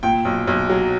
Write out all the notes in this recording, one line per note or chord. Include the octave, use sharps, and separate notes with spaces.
A#2 G5
B1
B1
F#3